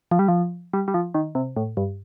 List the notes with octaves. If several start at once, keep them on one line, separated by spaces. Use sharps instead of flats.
F3
G3
F3
G3
G3
F3
D#3
C3
A2
G2